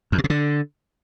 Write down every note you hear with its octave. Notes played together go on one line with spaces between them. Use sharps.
F2
B2
C3
D3